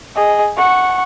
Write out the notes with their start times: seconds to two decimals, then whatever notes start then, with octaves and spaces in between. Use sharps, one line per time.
0.15 G#4 D#5
0.57 F#5 C#6